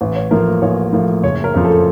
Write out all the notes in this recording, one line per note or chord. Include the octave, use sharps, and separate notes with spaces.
A1
C#5
A2 F3 A#3 A#4
A1 C#5
A2 F3 A#3
F#1 C#5
A#4
F2 C#3 F3
A4